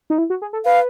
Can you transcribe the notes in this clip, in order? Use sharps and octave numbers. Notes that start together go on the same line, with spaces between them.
D#4
E4
F#4
G#4
A4
B4 F5